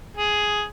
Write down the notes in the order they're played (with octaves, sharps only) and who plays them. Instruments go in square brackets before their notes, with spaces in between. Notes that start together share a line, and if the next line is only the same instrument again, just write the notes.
[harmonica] G#4